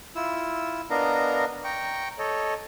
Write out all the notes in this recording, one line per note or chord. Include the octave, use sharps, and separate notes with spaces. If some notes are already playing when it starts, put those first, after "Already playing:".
E4 F4 E6
B3 D4 A#4 D#5 F5 A#5
G5 A#5 C#6
A4 C#5 D#5